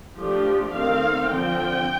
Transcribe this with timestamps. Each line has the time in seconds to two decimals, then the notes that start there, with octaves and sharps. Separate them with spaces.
0.19 F3 A3 D4 G4
0.75 D#3 A3 C4 F5
1.30 D3 F3 C4 G5